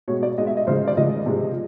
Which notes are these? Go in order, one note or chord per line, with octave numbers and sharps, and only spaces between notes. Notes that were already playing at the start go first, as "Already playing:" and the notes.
B2 G#3 C#5
D5
B2 G#3 D#5
E5
D#5
C#3 F3 G#3 C5
D5
C#3 F3 G#3 D#5
C3 F3 G#3